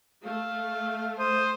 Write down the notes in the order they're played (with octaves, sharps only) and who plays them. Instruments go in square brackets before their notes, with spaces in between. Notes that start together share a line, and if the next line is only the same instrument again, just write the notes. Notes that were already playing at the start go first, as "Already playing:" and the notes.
[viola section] A3 [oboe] F5
[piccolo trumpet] C5 [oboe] D#6